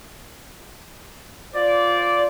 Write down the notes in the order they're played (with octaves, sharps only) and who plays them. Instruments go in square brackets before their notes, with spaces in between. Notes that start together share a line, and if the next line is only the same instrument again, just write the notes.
[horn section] F4 C5 D5